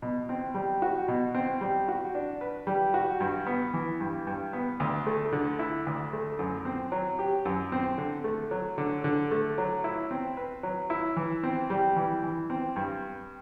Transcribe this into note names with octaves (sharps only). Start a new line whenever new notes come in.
B2
C4
G3
F#4
B2
C4
G3
F#4
D4
B4
G3
F#4
G2
B3
E3
G2
G2
B3
D2
A3
D3
E4
D2
A3
F#2
C4
F#3
G4
F#2
C4
D3
A3
F#3
D3
D3
A3
F#3
E4
C4
B4
F#3
E4
E3
C4
G3
E3
E3
C4
G2